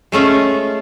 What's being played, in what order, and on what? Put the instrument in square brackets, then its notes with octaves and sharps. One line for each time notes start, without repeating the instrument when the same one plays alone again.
[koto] G#3 A3 C#4 F4